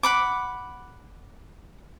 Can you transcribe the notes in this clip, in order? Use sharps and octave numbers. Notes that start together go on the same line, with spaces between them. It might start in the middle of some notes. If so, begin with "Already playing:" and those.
F#5 B5 D6